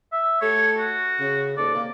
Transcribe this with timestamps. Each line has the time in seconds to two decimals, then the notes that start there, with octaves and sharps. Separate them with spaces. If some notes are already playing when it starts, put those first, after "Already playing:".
0.12 E5
0.41 A3 G4 A4 C#5
0.77 F#4
1.20 C#3
1.57 D#2 G#2 A4 D5
1.74 C3 A#3